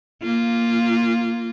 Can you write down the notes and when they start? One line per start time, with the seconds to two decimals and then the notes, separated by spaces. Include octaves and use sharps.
0.23 A#3 F4